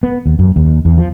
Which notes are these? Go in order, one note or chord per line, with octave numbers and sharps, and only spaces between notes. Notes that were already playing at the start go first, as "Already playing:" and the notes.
B3
D#2
F#2
D#2
E2
F3